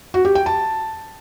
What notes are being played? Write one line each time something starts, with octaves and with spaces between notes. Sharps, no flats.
F#4
G4
G5
A5